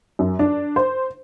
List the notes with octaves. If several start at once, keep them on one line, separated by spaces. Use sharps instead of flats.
F#2
D4
C5